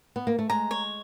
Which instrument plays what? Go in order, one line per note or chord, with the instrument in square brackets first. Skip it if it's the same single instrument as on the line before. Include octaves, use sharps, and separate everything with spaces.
[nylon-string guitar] B3
A#3
A3
[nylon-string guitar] G#3 [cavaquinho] A#5
[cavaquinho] C#5